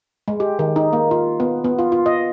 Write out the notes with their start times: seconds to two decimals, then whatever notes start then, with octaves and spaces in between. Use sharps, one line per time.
0.28 G#3
0.40 G4
0.59 D#3
0.76 D#4
0.93 A#3
1.11 F4
1.40 B3
1.64 B3
1.79 F4
1.92 F4
2.06 D#5